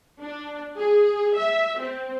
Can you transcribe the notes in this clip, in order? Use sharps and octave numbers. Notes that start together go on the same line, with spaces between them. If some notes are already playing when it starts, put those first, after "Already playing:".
D4
G#4
E5
C4